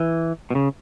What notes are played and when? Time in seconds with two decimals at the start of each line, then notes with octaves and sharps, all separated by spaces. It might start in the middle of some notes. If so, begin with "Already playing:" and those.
Already playing: E3
0.51 B2
0.55 C#3